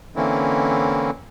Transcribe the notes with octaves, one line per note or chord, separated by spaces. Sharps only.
D3 E3 A#3 C4 C#4 E4